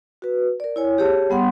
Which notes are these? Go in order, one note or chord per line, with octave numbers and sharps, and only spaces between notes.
F#4 B4
A#4 D5
E4 C#5 G#5
G4 G#4 C#5 A5
G3 B3 F#5 C6